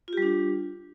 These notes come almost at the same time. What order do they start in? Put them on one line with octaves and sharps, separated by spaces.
F4 G4 G3 D4